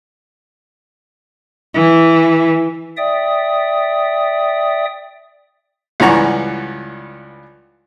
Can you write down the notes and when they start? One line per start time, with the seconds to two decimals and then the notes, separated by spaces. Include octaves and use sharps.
1.74 E3
2.97 D5 E5 G5 D#6
6.00 C#2 G2 E3 F#5 A#5 C#6